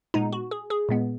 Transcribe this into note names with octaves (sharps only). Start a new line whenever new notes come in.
A#2 G#3 B3 D#4
F#4
G#4
G#4
A#2 G#3 B3